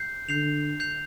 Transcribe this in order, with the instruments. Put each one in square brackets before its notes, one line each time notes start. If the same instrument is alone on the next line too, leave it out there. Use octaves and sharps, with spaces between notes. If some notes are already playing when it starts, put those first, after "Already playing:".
Already playing: [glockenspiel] G6 C7
[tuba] D3 [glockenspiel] G6 C7 F7
[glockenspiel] G6 C7 F7